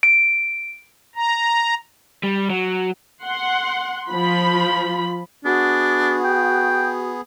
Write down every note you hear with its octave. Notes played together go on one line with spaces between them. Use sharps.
D7
A#5
G3
F#3
F#5 C6
F3 F4 B5
B3 D4 F#4 G#4
G5